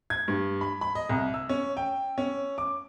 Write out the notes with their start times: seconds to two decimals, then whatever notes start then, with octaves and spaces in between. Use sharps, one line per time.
0.10 G#6
0.28 G2
0.61 B5
0.81 B5
0.95 D#5
1.09 C2
1.34 E6
1.49 C#4
1.77 G5
2.18 C#4
2.58 D6